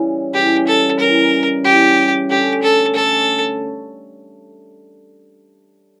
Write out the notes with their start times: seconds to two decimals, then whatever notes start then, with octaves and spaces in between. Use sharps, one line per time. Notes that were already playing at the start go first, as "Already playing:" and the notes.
Already playing: C#3 E3 G3
0.33 C#3 E3 G3 G4
0.67 A4
0.99 C#3 E3 G3 A#4
1.64 C#3 E3 G3 G4
2.29 D3 A3 C#4 G4
2.63 A4
2.95 D3 A3 C#4 A4